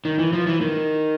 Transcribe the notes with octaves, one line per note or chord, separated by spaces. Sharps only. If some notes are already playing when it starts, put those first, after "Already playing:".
D#3
E3
F3
E3
D#3